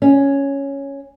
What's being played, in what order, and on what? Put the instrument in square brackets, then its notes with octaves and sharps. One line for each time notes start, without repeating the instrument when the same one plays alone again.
[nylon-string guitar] C#4